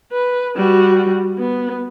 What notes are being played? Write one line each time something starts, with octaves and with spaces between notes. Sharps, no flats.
B4
G3 F#4
B3